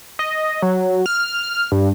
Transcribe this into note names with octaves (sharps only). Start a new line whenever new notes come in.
D#5
F#3
F6
G2